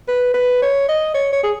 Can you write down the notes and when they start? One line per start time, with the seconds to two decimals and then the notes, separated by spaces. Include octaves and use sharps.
0.08 B4
0.34 B4
0.62 C#5
0.89 D#5
1.14 C#5
1.33 C#5
1.44 G#4